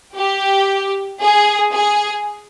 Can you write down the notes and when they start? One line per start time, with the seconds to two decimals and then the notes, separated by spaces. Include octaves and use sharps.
0.17 G4
1.21 G#4
1.73 G#4